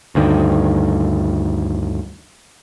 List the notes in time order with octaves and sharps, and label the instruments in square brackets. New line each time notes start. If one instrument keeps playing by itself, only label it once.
[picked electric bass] D2 G2 D#3